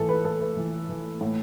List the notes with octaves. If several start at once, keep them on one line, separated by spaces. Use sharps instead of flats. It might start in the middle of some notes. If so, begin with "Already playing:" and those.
Already playing: A2 E3 A4
B4
A2 A4
B4
E3
E3
A2